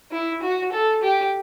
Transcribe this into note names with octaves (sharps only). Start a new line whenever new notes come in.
E4
F#4
A4
G4